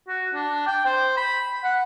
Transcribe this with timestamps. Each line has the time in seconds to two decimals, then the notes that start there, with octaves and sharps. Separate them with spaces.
0.08 F#4
0.34 D4
0.67 G5
0.86 C5
1.17 B5
1.64 F#5